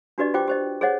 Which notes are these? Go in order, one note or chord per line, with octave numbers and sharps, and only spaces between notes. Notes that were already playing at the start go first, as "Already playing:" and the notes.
D4 F#4 G4 B4 D5 D#5
F4 G4 C5 G5 D6
G4 C5 D#5
G#4 C5 C#5 D#5 F#5